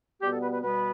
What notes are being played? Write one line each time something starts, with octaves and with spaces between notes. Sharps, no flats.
B2 G3 B3 G4
A4
B4
B4
B2 G3 B3 B4